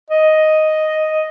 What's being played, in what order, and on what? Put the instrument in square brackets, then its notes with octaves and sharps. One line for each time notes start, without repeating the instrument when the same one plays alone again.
[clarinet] D#5